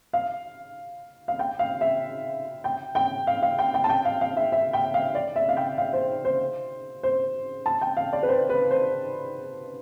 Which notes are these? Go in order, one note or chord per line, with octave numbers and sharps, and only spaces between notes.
F5
F5
G5
F5
E5
G5
G5
F5
F5
G5
G5
A5
G5
F5
F5
E5
E5
G5
F5
D5
E5
F5
G5
F5
C5
C5
C5
A5
G5
F5
D5
B4
C5
B4
C5